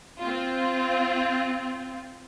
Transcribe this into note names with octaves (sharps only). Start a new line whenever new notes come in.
C4 F4